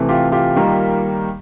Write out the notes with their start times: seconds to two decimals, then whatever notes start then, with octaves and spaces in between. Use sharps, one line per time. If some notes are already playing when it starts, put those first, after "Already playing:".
Already playing: C3 E3 A3
0.09 F4 G4
0.32 F4 G4
0.56 D#3 G3 A#3